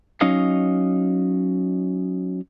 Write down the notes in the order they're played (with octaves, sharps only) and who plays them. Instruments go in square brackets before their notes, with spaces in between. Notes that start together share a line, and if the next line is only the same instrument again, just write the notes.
[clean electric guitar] F#3 C#4 D#4 C#5 D#5 F5